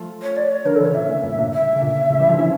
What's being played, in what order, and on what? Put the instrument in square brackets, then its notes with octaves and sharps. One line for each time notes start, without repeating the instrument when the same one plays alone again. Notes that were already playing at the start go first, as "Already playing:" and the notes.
Already playing: [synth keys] F3 A3
[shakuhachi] C#5
D5
C#5
[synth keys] D3 F3 [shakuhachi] A#4
[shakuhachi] A4
[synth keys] C#3 E3
[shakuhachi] C#5
[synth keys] A#2 D3 [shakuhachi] E5
[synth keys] A2 C#3
G2 A#2
A#2 D3
[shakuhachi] E5
[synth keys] C#3
A#2 D3
A2 C#3
E3 G3
D3 F3
C#4 E4